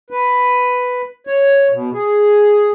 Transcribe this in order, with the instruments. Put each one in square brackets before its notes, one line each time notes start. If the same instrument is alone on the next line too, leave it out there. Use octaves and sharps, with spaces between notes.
[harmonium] B4
C#5
B2
G#4